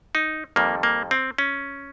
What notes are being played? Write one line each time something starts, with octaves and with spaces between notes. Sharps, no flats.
D#4
F2 D#3 G3 A#3
A#3
C4
C#4